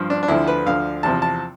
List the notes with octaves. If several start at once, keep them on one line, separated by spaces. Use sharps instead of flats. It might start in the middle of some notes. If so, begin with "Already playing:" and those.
Already playing: G2 F3
D4
D4
D2 D3 F3 E4
B4
D2 D3 F3 F5
E2 C3 F3 A5
A5